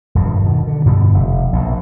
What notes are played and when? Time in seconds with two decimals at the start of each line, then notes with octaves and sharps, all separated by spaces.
0.15 D#1 G2 F3
0.42 B2 D#3
0.67 D3
0.85 G2 B2 D3 G3
1.14 F1
1.53 A#1 B2